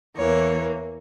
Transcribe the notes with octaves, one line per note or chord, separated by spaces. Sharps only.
E2 E3 A#3 C#5